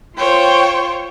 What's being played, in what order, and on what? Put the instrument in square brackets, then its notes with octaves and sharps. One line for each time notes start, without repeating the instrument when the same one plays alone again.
[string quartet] F4 C5 C#5 G5